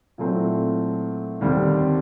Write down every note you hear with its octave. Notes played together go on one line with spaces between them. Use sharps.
A#2 F#3 A3 C4 E4
D#2 D3 G3 C4